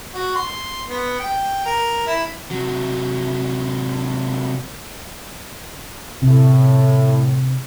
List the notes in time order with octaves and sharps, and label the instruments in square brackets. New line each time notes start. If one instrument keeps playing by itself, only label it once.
[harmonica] F#4
C6
B3
G5
A#4
E4
[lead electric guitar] C3 F#3
[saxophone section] A2 [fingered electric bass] C3